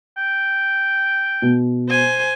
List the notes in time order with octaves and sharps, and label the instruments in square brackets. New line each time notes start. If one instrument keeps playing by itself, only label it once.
[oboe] G5
[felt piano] B2
[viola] C5 G#5